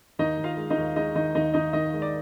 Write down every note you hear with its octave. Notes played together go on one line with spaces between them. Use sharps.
D#2 D#4 D#5
D#2
F4 F5
G#3
D#4 D#5
D#2
G#3 D#4 D#5
D#3 D#4 D#5
D#2 D#4 D#5
D#3 D#4 D#5
D#3 D#4 D#5
G#3
D5